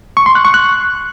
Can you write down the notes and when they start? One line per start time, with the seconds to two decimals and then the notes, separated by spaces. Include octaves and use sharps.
0.17 C#6
0.26 C6
0.35 F#6
0.45 C#6
0.54 F#6